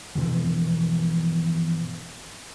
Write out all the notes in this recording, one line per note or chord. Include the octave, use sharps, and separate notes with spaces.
G2 B2 E3 F3